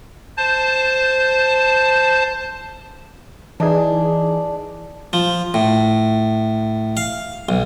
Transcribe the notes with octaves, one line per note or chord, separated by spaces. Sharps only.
C5 A5
E3 D4 D#4 G#4
F3
A2
F5
B1